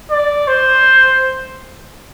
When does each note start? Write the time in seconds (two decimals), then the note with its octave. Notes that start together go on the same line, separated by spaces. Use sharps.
0.11 D5
0.48 C5